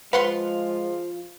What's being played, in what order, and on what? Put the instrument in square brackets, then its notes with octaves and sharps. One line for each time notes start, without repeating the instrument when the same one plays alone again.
[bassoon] F3 [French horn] G#3 [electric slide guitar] F4 F5 [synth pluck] B4 F#5 C6